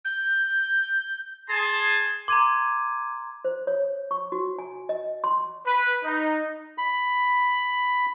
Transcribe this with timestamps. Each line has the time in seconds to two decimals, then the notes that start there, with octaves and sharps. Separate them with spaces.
0.05 G6
1.49 G#4 G#5 A5 C6
2.28 A#5 C6 D6 G#6 D#7
3.45 C5
3.67 C#5
4.11 C#6
4.32 F#4
4.59 G#5
4.89 D#5
5.24 C6
5.66 B4
6.04 D#4
6.78 B5